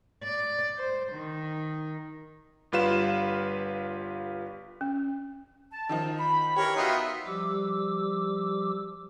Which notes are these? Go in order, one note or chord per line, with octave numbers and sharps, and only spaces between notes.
D5
C5
D#3
G1 G3 F4 B4 F5 E7
C#4
A5
D#3 F3 D#4
B5
E3 G4 A#4 C#5
B3 D#4 F4 F#4 E5 G5
F3 G3 G4 D6 E6